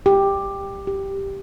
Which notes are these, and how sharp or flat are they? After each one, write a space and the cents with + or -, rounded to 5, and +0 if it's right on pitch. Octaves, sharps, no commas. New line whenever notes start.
G4 +10
G4 +0